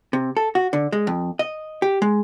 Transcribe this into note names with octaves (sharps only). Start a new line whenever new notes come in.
C3
A4
F#4
D3
G#3
F2
D#5
G4
G#3